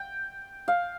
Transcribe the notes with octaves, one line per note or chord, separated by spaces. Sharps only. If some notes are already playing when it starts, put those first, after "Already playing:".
Already playing: G5
F5